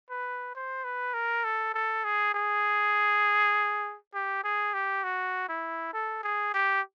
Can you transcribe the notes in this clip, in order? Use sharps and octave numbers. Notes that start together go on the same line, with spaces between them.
B4
C5
B4
A#4
A4
A4
G#4
G#4
G4
G#4
G4
F#4
E4
A4
G#4
G4